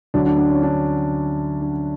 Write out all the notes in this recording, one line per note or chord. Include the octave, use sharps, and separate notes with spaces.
D2 D3 F#3 D4
D4
D4
C#4
D4
D4